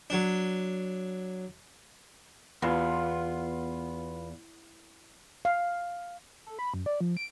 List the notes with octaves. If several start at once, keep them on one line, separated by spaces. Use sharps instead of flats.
F#3 D4
E2 B3 F4
F5
A4
B5
F#2
D5
F3
D7